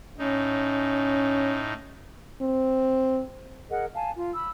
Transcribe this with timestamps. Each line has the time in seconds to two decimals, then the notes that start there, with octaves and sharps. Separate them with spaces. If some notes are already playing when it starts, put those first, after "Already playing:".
0.18 A2 C#4 D#4
2.42 C4
3.70 G#4 A#4 D#5 F#5
3.94 F5 G#5 A5
4.15 F4
4.34 B5 E6